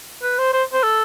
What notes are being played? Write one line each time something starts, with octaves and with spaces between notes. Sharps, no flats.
B4
C5
C5
C5
A4